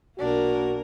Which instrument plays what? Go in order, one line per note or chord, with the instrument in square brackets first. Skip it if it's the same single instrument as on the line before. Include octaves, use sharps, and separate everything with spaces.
[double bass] B1 D4 [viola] A#3 A#4 [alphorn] F#4